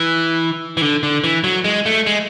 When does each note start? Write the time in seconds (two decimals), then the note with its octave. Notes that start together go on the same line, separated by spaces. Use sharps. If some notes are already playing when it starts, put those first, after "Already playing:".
Already playing: E3
0.77 E3
0.82 D3
1.03 D3
1.24 E3
1.44 F#3
1.64 G#3
1.86 A3
2.06 G#3